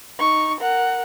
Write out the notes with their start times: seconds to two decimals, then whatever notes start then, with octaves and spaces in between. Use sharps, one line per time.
0.19 D#4 C#6
0.61 A#4 F#5